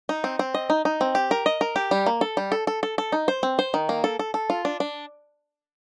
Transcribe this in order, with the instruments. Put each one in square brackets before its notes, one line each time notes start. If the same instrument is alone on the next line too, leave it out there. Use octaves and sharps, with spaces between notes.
[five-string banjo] D#4
C4
C4
D#5
D#4
D#4
C4
G4
A#4
D#5
A#4
G4
G3
A#3
A4
G3
A4
A4
A4
A4
D#4
C5
C4
C5
D#3
A#3
A4
A4
A4
F4
D4
D4